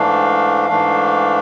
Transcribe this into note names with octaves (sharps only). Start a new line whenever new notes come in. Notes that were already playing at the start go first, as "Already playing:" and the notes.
Already playing: G#2 E3 A3 D4 F5
G#2 E3 A3 D4